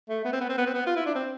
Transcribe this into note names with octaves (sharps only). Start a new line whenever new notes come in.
A3
B3
C4
B3
C4
B3
C4
B3
F4
E4
D4
C4